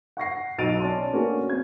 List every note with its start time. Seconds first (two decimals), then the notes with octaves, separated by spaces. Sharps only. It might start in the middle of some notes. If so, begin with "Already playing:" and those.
0.17 F#5 C#6 A#6 C7
0.58 B1 D#5 A6 D7 D#7 F7
0.80 C#4 C#5 D5 A5 C6
1.13 A3 A#3 C#4 D4 F#4 G#4
1.49 C4 G#6